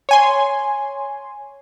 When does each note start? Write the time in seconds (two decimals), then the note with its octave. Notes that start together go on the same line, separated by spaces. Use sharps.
0.09 C#5 G#5 C6